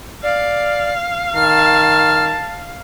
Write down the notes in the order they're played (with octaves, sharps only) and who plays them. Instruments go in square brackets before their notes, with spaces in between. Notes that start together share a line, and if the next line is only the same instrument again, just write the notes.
[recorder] D5 [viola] F5
[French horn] D#3 [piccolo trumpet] A5 [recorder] F6